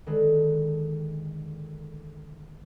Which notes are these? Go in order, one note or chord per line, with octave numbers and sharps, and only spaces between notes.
D3 D#3 G#3 A4 B4